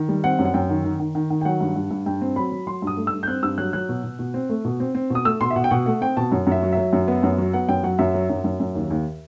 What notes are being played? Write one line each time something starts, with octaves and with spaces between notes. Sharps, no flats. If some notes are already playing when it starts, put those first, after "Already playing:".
Already playing: D#3
G3
C4 F#5
F#2
F#5
F#2 G5
D#3
D#3
D#3
D#3
D#3
G5
F#3 F#5
G2
G2
G2
G2 G5
C4
F#3 B5
F#3
F#3 C6
G2 D#6
A3
E6
G2
G6
C4 F#6
G2 E6
F#3 F#6
F#3 F#6
B2
B2
B2
C4
A3
B2
C4
C4
B2
D#6
A3 E6
B2 C6
E5
B2 F#5
G5
B2 F#5
A3 F#5
C4 G5
B2 A5
F#2
F#2 E5
F#3
F#3 E5
F#2
B3
F#2
F#3
B3 F#5
F#2 G5
F#3 F#5
F#2 E5
F#3
F#2
F#2
F#2
D#2
D#2